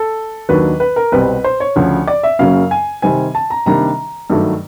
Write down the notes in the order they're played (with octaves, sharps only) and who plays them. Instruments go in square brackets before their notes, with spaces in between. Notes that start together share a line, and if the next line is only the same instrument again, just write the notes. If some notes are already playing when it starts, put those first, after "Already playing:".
Already playing: [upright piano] A4
D#2 D#3 F#3 A#3 D4 B4
B4
A#4
C2 B2 G3 C4 B4
C5
C#5
D2 C#3 F3
D5
E5
F#2 C#3 F#3 A#3 C#4 F5
G#5
C3 D#3 G3 C4 G#5
A5
A#5
C3 D#3 G3 A#3 D4 A#5
G2 D#3 F#3 A3